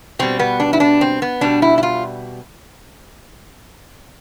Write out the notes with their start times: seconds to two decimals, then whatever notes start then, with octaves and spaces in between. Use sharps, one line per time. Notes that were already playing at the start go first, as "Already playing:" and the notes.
0.19 B2 G3 C4
0.39 B3
0.60 D4
0.73 E4
0.80 D4
1.01 C4
1.22 B3
1.41 B2 G3 D4
1.62 E4
1.78 E4
1.83 F4